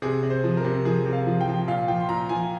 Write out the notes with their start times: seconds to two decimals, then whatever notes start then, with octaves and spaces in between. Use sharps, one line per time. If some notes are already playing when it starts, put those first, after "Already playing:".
0.02 C3 G#4
0.23 C3
0.30 C5
0.44 F3
0.57 A#4
0.64 C3
0.85 F3 G#4
1.06 C3
1.13 F5
1.26 F3
1.41 G5
1.47 F3
1.68 A#2 F5
1.88 F3 G5
2.00 C6
2.09 A#2 A#5
2.29 F3 G#5